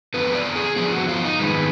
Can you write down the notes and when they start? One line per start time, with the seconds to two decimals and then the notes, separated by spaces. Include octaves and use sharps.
0.14 F2 D3 F3 B3 B4
0.35 D5
0.56 G#4
0.76 F2 D3 F3 B3 G#4
0.92 F#4
1.08 F4
1.24 D#4
1.39 G#2 D#3 G#3 B3